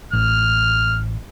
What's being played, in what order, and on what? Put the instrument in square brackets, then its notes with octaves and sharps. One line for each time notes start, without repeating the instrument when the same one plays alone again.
[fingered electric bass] A1 [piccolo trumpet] F6